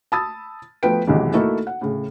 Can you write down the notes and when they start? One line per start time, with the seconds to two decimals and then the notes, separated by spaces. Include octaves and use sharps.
0.12 A5 B5 D#6 E6 A6
0.83 F3 A3 B3 B4 G5 D7
1.07 B1 G#2 C3 D#3 E3
1.34 A3 A#3 D#4 E4 F#4 A4
1.67 F#5
1.81 A2 C#3